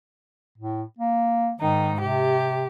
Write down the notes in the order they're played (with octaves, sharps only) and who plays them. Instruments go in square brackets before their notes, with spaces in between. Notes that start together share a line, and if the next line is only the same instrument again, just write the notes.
[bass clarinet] A2
A#3
[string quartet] G#2 D#4 [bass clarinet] D#3
[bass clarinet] C3 [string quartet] G4